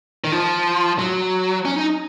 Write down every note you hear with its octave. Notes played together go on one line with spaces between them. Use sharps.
D#3
F3
F#3
C#4
D#4